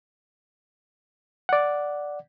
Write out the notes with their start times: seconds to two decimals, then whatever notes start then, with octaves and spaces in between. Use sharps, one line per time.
1.49 D5 F#5